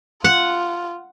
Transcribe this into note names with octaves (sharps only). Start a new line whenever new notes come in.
F4 F#5